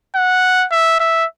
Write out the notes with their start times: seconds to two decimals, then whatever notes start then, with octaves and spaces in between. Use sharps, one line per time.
0.15 F#5
0.71 E5
1.00 E5